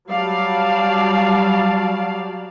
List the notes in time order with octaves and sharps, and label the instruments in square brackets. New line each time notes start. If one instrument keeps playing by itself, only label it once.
[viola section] F#3 G3 F#4 D5 F5 A5